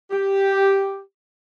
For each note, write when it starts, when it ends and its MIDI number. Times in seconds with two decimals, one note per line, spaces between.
0.11 1.00 67